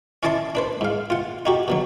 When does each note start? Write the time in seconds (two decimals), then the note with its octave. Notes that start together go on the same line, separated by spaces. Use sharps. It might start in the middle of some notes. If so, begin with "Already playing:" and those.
0.23 C#4 E4 D5 D#5 A5 C6
0.55 D4 B4 C5
0.81 G#2 F5
1.10 F4 F#5
1.46 D#4 F#4 G4
1.68 B2 D3 F#3